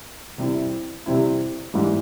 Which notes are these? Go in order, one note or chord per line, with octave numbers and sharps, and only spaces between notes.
C3 G3 C4 E4
C3 G3 C4 E4
G#2 E3 G3